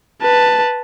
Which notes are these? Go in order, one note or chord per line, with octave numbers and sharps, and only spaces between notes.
B4 A5